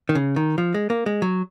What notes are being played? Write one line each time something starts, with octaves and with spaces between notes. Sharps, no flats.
D#3
C#3
D#3
F3
G#3
A#3
G#3
F#3